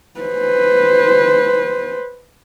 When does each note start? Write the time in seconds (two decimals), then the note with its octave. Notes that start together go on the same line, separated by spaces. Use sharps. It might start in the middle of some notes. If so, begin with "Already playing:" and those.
0.20 B4 C5